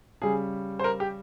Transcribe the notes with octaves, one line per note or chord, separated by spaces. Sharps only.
C#3 G3 G#4
C5
A#4
G4